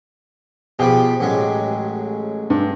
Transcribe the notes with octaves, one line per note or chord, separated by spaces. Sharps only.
B2 F3 G4 G#4 G5 B5
A1 F#3 G#3
G2